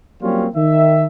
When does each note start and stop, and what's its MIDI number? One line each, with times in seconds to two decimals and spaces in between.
0.22 0.46 54
0.22 0.46 55
0.22 0.46 58
0.22 0.46 60
0.22 0.46 61
0.22 0.46 65
0.55 1.07 51
0.55 1.07 76